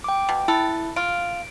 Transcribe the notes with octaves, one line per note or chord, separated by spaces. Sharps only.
G5 D6
B2 G5
E4 A4
F4 D7